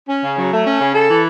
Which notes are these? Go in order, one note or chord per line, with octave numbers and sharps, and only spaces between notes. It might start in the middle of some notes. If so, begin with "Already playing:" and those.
C#4
C#3
F#3
A3
C#4
C#3
A4
E3